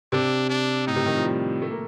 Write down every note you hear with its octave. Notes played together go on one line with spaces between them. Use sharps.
C3 D4
D4
A2 D#4
C3
D#3
F3
G3
A3
A#3